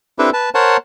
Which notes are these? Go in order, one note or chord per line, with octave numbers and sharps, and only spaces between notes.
C4 D4 E4 G4 A4 B4
B4 A5
A#4 C5 C#5 F#5 A5